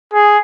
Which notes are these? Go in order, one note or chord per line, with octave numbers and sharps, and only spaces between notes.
G#4